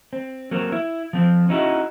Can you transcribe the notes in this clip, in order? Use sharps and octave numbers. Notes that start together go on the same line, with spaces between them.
C4
F#3 A#3 C4
E4
F3 C4
C#4 D#4 E4 F#4